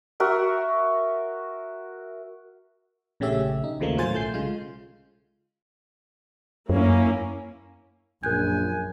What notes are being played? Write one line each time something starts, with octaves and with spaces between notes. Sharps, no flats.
F#4 A#4 E5
A#1 C#3 A3 C#4 G4 E5
D#4
D#2 C#3 F3 A3 A#3
A2 F#3 F4 C5 G#5 A6
B1 A3 G6 C7
C#3 G#3 F4
F#2 A#3 C#4 E4
A#1 F#2 A#4 G#5 F#6 G6